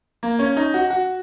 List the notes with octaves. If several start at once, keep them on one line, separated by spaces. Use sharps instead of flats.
A#3
C#4
D#4
F#4
F#4